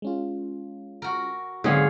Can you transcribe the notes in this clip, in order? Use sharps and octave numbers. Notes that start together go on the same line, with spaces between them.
G#3 C#4 F4
F#4 A#4
G#2 D3 F#3 B3 C4 G#4 D5 F5